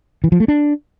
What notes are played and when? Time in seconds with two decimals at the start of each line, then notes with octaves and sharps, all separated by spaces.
0.24 E3
0.32 F3
0.40 A3
0.48 D4